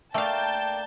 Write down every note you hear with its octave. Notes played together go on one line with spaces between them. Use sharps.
A3 A#3 D4 F5 G5 A5 G6